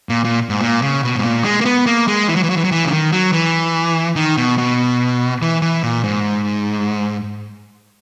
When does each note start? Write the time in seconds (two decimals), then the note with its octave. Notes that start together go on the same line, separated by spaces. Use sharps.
0.09 A#2
0.25 A#2
0.49 G#2
0.61 A#2
0.82 C#3
1.03 B2
1.16 G#2
1.23 A#2
1.44 G#3
1.61 A#3
1.66 B3
1.86 A#3
2.08 G#3
2.28 E3
2.36 F#3
2.43 E3
2.50 F#3
2.57 E3
2.65 F#3
2.72 E3
2.85 C#3
2.91 D#3
3.12 F#3
3.33 E3
4.16 D#3
4.37 B2
4.58 B2
5.42 E3
5.62 E3
5.83 A#2
6.04 G#2